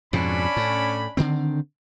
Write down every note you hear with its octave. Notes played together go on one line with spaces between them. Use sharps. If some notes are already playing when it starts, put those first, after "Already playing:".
F2 G#2 B2 C#4 D4 B5
A2
D3 D#3 C4